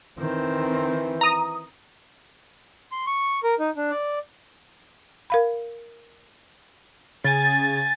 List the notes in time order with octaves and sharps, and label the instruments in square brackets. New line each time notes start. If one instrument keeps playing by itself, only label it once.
[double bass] D#3 C4 [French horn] E3
[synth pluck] A#5 D#6
[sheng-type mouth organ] C6
C#6
A#4
D#4
D4
D5
[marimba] A#4 F5 B5
[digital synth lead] C#3 [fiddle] G#5 [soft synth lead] A6